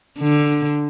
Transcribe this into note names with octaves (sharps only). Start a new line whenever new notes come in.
D3